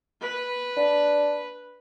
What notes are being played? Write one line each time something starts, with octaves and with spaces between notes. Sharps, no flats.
B4
D4